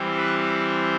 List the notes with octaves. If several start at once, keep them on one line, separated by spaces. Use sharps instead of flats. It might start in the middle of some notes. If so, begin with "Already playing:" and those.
Already playing: E3 G3 C4
B4